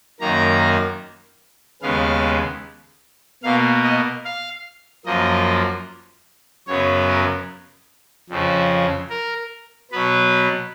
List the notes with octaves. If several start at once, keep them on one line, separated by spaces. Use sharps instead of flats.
F#2 D#3 A#3 A#5
D#2 C#3 G#3 B3 F5
B2 A#3 F5
D#5
F5
F#2 F3 A#3 D#5
F#2 C#3 F#3 B3 C#5
A#4
F2 C#3 F3
A#4
B2 F#3 B3 B4